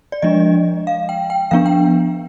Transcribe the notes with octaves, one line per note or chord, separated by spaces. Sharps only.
D5
F3 G#3 D4 D#5
F5
G5
G5
F3 B3 D4 F5
G5